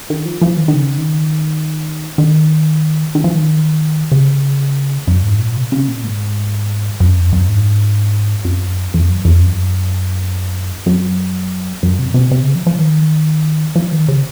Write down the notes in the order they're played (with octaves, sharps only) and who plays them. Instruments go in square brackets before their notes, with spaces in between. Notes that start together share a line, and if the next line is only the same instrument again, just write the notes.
[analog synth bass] D#3
F3
F3
D#3
D#3
C#3
D#3
D#3
D#3
F3
D#3
C#3
F#2
G#2
A#2
C3
C#3
A#2
G#2
F#2
F2
F#2
G#2
F#2
F2
F#2
F2
F#2
F#2
F#2
C3
C3
C3
C#3
F3
F3
D#3
F3
D#3
C#3